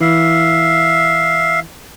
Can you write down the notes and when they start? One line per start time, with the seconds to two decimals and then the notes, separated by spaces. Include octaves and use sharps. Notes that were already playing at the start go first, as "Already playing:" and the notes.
0.01 E3 E5 F5